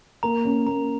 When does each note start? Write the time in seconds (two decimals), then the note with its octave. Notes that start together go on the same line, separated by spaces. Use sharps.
0.23 A#3 A#5
0.45 C#4
0.66 A#3 A#5